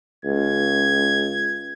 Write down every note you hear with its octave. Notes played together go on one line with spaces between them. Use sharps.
C#2 G#6